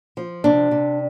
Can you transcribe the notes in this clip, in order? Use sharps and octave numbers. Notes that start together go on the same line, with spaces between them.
F3
C3 D4
C3